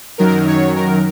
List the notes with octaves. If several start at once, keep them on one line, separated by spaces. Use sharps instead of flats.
F#2 D#3 F#3 A#4
C#5
A#4